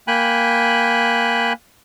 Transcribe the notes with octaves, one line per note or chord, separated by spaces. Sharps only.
A#3 G5 G#5 B5 F#6